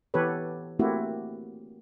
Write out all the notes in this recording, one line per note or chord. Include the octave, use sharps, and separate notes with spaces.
E3 B3 G4 A4 B4 C#5
A3 A#3 C4 E4 F#4 G4